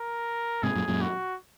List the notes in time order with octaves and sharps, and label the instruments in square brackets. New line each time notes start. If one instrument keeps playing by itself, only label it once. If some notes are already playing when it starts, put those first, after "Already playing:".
Already playing: [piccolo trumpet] A#4
[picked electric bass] G#2 C3 [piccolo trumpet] G#4
[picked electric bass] F#2 A#2
F#2 A#2
[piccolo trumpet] F#4